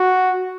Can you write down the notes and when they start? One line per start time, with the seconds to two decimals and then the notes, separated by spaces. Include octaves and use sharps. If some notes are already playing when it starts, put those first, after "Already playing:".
Already playing: F#4